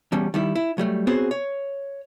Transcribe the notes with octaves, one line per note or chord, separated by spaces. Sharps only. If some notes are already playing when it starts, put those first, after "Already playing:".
E2 B2 G3 C#4
D#3 G3 E4
E4
F#3 G3 A3
B3 C4 F#4 G#4 C5 C#5
C#5